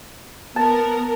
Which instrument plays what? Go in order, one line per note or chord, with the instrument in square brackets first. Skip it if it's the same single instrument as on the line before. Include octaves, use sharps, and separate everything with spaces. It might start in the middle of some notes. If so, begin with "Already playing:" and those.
[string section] B3 A#4 [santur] A5